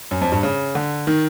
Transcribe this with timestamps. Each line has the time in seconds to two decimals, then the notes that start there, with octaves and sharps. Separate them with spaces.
0.11 F#2
0.21 F2
0.32 G2
0.43 C#3
0.75 D3
1.07 D#3